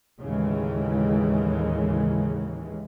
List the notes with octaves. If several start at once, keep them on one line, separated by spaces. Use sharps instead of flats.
D#2 A2 C#3 E3 G#3